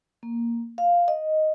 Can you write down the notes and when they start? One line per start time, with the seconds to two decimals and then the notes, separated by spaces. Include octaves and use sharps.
0.23 A#3
0.78 F5
1.08 D#5